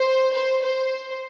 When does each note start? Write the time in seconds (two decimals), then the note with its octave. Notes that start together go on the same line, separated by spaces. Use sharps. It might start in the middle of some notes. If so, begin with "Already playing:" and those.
Already playing: C5
0.34 C5
0.63 C5